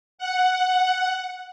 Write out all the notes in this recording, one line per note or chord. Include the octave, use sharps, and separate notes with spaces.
F#5